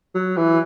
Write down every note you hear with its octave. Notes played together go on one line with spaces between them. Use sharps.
F#3
E3